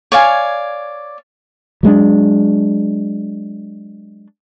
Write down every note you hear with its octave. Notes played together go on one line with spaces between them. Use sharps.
C#5 D5 F5 G#5
F#3 G#3 B3 D4